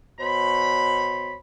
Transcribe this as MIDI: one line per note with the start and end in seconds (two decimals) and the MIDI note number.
0.19 1.34 47
0.19 1.34 72
0.19 1.34 73
0.19 1.34 83